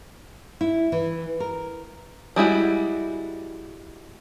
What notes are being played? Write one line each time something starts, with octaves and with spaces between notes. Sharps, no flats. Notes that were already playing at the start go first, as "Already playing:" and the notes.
E4
E3
A#4
G3 G#3 E4 F#4